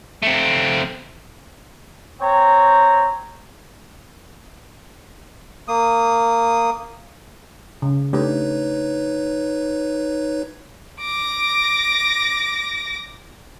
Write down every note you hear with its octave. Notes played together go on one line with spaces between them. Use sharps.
A3 C4
C4 C#5 G5 A#5
A#3 D#6
C#3
A3 D4 D#4 G4 B4 C#5
D6 A#6